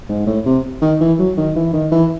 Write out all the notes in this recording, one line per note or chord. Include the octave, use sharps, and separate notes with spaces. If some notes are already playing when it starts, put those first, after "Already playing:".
G#2
A2
C3
D#3
E3
F#3
D#3
E3
D#3
E3